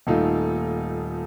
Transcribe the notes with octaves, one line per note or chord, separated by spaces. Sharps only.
D#1 A3 D#4 F4